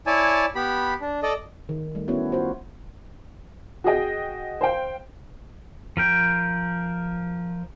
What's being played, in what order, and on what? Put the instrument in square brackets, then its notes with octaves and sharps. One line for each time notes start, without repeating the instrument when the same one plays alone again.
[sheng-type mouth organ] E4 C#5 D5 G#5 A5
B3 G4 B5
D4
A4 D5 D#5
[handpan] D#3
G3 A3
B3 C#4 E4 F#4 C#5
F4 F#4 C5
[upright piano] F#4 G#4 D#5 G5
C5 F5 G5
[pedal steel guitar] F3 A#4 G5